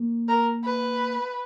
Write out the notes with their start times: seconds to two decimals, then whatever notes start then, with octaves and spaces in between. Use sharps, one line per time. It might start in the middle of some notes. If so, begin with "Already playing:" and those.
Already playing: A#3
0.28 A#4
0.64 B4